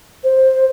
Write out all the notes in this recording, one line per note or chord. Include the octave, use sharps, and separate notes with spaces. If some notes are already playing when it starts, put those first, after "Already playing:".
C5